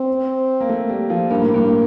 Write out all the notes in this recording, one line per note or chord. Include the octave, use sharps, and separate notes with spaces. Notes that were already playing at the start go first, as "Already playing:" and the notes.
Already playing: C4
A#3
A3
G3
F3
G2 A#3
A2
G2